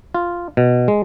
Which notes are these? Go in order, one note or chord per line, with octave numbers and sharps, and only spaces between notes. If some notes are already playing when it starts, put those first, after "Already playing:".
F4
B2
G#3